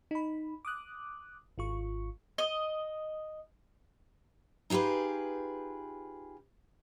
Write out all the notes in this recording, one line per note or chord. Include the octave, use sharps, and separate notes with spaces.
D#4 B5
D6 D#6 F#6
G#1 F4 C#6
D#5
D#4 F4 G4 G#4 B4